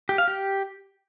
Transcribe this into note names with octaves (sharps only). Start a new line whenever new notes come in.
G4
F5
G4